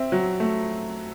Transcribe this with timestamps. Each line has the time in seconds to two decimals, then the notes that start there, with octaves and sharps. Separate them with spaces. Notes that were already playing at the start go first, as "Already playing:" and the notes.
Already playing: C4 E5
0.12 F#3
0.40 A3